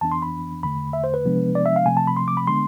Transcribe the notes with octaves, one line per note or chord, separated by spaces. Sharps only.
F2 E3 B3 D4 A5
C6
B5
E2 D3 A3 B5
E5
C5
B4
C3 F3 G#3 B3 D4
D5
E5
F5
C3 F3 A3 C4 G#5
A5
B5
C6
D6
B5
D3 G#3 B3 D4 C6